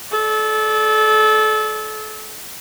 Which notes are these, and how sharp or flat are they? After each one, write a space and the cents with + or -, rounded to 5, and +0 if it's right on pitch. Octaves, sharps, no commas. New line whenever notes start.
A4 -30 D5 +0